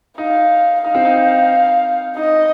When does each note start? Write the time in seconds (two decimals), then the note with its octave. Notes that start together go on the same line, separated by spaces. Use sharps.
0.18 D#4 F5
0.84 D#4 F5
0.95 C4
1.05 D#4
2.17 D#4 D#5